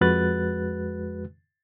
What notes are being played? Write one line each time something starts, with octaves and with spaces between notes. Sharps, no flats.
F2 G#3 F#4 B4 F#6 A6